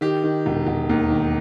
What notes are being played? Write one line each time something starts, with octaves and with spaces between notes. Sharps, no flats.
D#3 G4
D#3
E1
E1
D#2
D#3